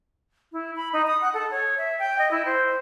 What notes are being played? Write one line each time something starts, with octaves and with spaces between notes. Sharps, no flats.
E4
B5
D#4
D#6
F#5
A4
C#5
E5
G5
D#5
E4
C5